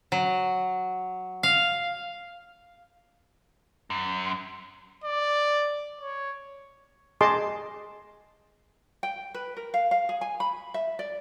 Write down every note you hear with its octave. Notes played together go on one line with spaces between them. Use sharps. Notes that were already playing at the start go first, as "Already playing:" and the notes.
F#3
F5
F#2
D5
C#5
G#4 D#5 A5 C6 D6
G5
B4
A#4
F5
F5
G#4
G#5
B5
E5
D5